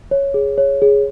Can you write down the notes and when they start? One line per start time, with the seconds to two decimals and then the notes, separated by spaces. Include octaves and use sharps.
0.11 C#5
0.34 G#4
0.58 C#5
0.82 G#4